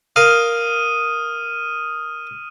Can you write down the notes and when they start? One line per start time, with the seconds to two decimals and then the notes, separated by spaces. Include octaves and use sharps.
0.16 A#4 F5 D#6 F6 D#7